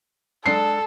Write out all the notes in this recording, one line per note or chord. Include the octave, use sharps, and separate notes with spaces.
F#3 G#3 D4 A4 C7